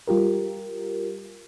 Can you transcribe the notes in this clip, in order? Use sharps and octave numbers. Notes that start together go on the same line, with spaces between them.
G3 F4 G4 A#4